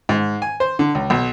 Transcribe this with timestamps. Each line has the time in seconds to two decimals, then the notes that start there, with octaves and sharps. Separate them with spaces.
0.09 G#2
0.42 G#5
0.60 C5
0.79 D3
0.95 C#2
1.10 B1